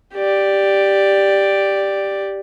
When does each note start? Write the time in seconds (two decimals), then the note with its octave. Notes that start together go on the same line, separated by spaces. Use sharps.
0.14 G4 D5